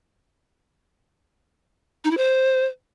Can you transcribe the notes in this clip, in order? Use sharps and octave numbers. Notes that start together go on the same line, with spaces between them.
D#4
E4
C5